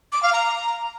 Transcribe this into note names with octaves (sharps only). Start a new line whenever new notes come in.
D6
F5
A#5